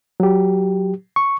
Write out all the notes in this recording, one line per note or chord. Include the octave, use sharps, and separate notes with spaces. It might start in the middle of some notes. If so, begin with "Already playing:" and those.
F#3 G4
C#6